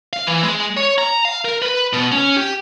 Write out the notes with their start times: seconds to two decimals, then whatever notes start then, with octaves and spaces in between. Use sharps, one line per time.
0.13 F5
0.27 E3
0.43 G#3
0.77 C#5
0.98 A#5
1.25 F5
1.45 A#4
1.62 B4
1.93 B2
2.12 C#4
2.37 G4